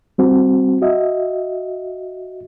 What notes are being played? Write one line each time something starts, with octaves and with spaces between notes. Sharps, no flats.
G3 C4 F#4
F#4 D#5 E5